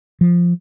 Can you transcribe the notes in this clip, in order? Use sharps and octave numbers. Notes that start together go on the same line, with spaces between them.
F3